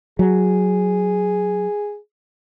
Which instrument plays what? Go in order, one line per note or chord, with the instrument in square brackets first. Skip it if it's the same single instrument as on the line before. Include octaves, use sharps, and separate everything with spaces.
[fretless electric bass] F#3 [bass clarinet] G#4